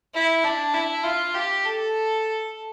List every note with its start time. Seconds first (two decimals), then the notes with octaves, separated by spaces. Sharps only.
0.14 E4
0.44 D4
0.74 E4
1.03 F4
1.34 G4
1.64 A4